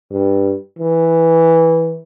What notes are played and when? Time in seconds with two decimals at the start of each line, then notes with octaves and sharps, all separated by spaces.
0.11 G2
0.79 E3